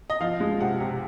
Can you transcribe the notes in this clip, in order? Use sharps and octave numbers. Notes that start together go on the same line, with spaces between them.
D#5
F3 F5
G#3
C3 F#5
C3